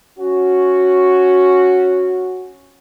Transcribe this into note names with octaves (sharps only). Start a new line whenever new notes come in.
C#4 F#4